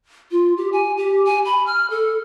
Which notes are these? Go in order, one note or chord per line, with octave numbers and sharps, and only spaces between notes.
F4
G4
G#5
G4
G#5
B5
F6
A4